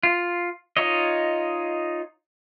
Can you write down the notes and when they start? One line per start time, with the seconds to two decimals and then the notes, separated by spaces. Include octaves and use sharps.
0.03 F4
0.77 D#4 F4 C#5 D#5